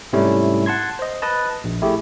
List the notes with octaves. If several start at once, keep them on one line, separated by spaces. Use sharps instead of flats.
G#2 C3 G3 A3 C#4 E4
F#5 A5 C6 G#6
C5 D#5
B4 D#5 A5
A#1
A3 E4 G4 G#4